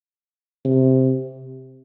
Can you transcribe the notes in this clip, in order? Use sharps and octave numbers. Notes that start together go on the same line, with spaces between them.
C3